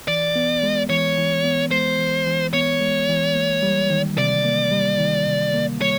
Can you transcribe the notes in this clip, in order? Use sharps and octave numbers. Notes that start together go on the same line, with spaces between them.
E3 D5
B3
G#3
E3 C#5
E3
B3
G#3 C5
E3
E3
B3 C#5
G#3
E3
A#3
G3
D#3
C3 D5
A#3
G3
D#3
C3
A#3
G3 C#5